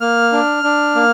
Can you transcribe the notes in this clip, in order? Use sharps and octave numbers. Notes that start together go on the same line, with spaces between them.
A#3 F6
D4
D4
A#3